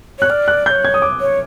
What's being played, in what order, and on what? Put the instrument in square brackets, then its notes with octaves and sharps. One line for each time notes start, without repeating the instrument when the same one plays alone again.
[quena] C#5 [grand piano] F#6
[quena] D5 [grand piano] F6
[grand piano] F#6
[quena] D5 [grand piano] G6
[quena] C#5
[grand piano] G#6
D#6
D6
[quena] C#5